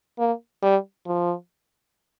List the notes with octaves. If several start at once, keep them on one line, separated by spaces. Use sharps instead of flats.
A#3
G3
F3